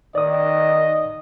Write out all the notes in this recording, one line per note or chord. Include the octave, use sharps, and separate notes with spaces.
D#3 D5 D#5 D#6